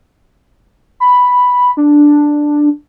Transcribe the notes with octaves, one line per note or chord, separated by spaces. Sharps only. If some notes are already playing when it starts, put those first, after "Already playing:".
B5
D4